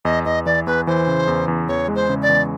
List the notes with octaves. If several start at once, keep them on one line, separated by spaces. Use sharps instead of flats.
E2 D#5
E2 D#5
E3 D5
E2 B4
E3 C5
C#3
E2
E2
E2 C#5
G#3
C5
C#3
D5
E2